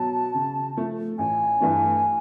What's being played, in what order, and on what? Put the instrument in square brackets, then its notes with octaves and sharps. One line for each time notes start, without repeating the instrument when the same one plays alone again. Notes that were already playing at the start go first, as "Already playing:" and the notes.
Already playing: [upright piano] B2 F#3 [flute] A5
[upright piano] C#3
F3 A3
[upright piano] A1 [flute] G#5
[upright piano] G2 E3 A3 D4